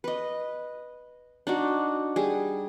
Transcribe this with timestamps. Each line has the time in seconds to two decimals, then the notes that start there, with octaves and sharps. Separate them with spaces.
0.04 B4 D#5
1.47 D4 D#4 F#4
2.16 G3 G#4